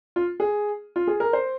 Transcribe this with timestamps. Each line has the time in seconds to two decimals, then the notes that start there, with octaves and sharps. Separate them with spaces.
0.16 F4
0.40 G#4
0.96 F4
1.07 G#4
1.20 A#4
1.33 C5